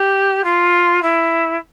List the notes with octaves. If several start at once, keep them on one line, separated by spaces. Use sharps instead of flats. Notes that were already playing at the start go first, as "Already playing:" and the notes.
Already playing: G4
F4
E4